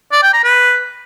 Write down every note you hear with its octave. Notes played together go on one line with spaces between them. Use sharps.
D5
G5
A#5
B4